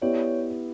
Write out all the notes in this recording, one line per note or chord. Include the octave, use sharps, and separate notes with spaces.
B3 E4 G4 C#5 D5